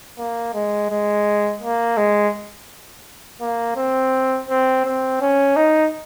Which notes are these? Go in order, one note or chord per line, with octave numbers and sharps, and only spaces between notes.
A#3
G#3
G#3
A#3
G#3
A#3
C4
C4
C4
C#4
D#4